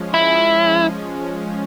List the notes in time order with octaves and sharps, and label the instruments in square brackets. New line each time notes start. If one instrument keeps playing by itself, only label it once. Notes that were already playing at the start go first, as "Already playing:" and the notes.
Already playing: [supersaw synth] F3 G#3 C#4
[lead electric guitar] E4